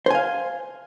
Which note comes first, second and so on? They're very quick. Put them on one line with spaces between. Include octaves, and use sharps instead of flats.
C5 G#5 F5